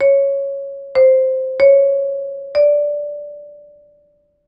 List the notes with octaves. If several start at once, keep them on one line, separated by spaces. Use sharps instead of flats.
C#5
C5
C#5
D5